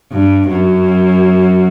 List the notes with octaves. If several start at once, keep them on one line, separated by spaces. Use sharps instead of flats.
G2
F#2